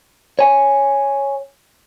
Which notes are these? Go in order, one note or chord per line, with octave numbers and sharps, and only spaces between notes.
C#5 G#5